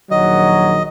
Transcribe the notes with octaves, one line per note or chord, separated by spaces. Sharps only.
A#1 D#3 F#3 D#5